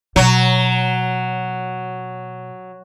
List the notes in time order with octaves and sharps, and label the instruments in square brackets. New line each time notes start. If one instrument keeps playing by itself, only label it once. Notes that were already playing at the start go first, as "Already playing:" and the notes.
[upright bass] B2 [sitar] F#3